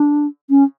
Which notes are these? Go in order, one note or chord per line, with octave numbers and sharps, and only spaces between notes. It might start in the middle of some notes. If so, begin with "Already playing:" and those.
Already playing: D4
C#4